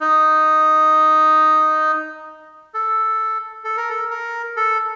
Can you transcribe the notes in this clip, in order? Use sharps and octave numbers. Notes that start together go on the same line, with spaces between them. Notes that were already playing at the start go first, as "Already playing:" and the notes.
D#4
A4
A4
A#4
A4
A#4
A4